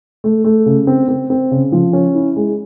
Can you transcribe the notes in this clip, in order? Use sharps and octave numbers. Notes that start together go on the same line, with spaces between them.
A3
A3
C#3
C4
C4
C4
C#3
F3
C#4
E4
G#3